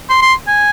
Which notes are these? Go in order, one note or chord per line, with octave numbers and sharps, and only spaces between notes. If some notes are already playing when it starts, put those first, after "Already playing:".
C6
C6
G#5